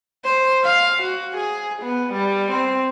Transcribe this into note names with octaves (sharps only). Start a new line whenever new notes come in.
C5
F5
F#4
G#4
B3
G3
C4